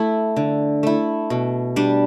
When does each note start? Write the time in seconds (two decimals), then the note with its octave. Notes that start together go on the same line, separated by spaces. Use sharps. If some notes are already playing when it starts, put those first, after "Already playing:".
Already playing: A3 E4
0.36 D3
0.83 A3 E4
1.30 B2
1.76 G3 D4